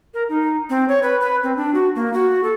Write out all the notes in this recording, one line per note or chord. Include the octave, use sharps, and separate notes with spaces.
A#4
D#4
C4
C#5
B4
B4
C4
D4
F#4
A#3
F#4
A4